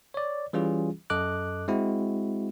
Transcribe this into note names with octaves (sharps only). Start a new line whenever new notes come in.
C#5 D5
E3 G3 C#4 F4 G#4
F#2 A4 D#5 D6 F#6
G#3 C4 E4 F#4